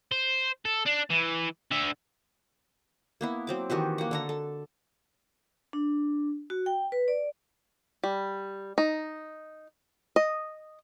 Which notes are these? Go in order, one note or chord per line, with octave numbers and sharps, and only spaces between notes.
C5
A4
D4
E3
D3 E5
A#3 B3 E4
F#3 C4 D6
D#3 E3 F#4 G4
A#3 F#5
D3 A4 A#5
A4
D4
F#4
G5
B4
D5
G3
D#4
D#5